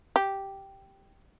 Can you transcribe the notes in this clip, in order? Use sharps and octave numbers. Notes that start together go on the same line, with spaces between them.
G4